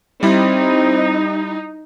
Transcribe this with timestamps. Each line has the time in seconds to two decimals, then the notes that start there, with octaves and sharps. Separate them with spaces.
0.23 G3 C4 D#4 E4